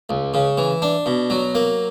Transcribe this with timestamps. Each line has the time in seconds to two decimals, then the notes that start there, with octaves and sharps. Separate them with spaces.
0.09 C#2
0.34 C#3
0.58 E3
0.82 D4
1.06 B2
1.30 F#3
1.55 A#3